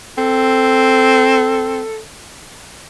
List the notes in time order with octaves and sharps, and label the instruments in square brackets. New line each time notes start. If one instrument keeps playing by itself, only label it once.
[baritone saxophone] C4 [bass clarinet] A4